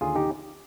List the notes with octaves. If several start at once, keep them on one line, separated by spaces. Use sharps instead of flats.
D#2 D3 F4 G#4
D#4 G4